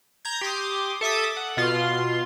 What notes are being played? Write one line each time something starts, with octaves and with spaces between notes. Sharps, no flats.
A#5 G6 G#6
G4 C6 D6 D#6
A4 E5 D6 D#6
F#5
B2 F4 C6